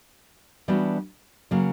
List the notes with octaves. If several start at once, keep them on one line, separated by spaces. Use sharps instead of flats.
E3 G3 B3 D4 F#4
C#3 F#3 A#3